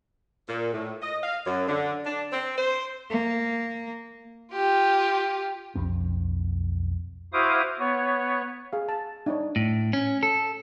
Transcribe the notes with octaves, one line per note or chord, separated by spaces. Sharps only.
A#2
A2
D#5
F5
F#2
D3
D4
C4
C5
A#3
F4 G4
B1 F2 C4
E4 F#4 C5 F5 D6 D#6
B3 C#5
G#4 F5
A5
D4 D#4 C#5
A2
C#4
A4